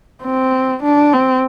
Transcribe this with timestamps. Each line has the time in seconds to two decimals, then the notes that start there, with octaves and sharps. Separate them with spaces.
0.24 C4
0.83 D4
1.13 C4